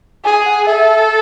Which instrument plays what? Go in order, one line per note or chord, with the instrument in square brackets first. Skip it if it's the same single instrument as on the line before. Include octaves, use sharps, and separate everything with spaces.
[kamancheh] G#4 [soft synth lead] G#5
[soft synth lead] F#5
[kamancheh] A4 [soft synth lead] E5